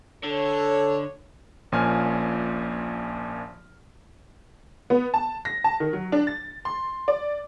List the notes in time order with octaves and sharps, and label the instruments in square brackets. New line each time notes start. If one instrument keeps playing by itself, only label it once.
[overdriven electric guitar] D3 [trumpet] A4 [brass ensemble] C#5
[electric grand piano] A#1 A#2 F3 C#4 G#5 F6
[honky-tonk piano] B3
A5
A#6
A5
D#3
F#3
D4
A6
C6
D5